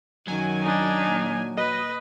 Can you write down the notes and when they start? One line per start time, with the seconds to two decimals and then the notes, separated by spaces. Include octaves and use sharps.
0.28 F#2 D#3 F#3 G#5
0.63 D4 D#4
1.07 A#2
1.57 B4 D#5